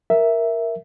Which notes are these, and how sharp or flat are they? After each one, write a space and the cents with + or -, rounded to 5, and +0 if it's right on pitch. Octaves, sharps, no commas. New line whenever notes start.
A#4 +0 E5 +0